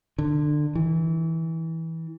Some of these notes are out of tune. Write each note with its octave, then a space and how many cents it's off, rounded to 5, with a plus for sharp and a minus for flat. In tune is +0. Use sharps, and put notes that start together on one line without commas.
D3 +20
E3 -20